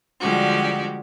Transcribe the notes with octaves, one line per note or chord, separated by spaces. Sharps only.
D3 F3 G3 G#3 F#4 G4